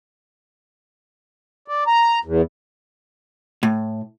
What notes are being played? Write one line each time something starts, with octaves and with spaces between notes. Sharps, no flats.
D5
A#5
E2
A2